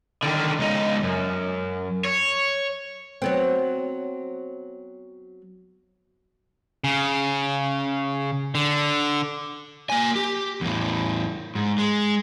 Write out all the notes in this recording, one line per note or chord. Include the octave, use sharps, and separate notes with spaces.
D3 D#3
C#2 D#4
F#2
C#5
F#3 B3 C4
C#3
D3
A#3 G#5
G4
E2 A2
G#2
G#3